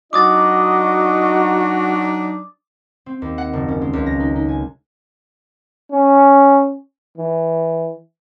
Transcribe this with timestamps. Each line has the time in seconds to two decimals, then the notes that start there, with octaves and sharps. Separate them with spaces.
0.13 F#3 D4 D#4 F#4 D#5 D6 D#6 A6
3.06 C4
3.22 D#2
3.38 F#5
3.53 F#1
3.68 C#4
3.81 G#3
3.93 C#2
4.06 A#6
4.20 D#4
4.36 D#4
4.48 G#5
5.92 C#4
7.18 E3